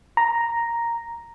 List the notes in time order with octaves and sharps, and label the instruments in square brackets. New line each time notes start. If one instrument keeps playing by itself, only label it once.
[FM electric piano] A#5